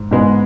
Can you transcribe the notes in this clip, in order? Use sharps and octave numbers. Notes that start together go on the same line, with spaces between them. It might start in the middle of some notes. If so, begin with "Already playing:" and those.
Already playing: G#2
G#2 G#3 B3